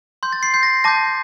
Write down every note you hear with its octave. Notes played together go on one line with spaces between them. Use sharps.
C6 G6
A6
C7
C6 G6 C7
A#6
A5 D6 G6 A#6